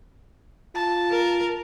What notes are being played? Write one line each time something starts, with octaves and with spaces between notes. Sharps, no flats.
F4 A5
A#4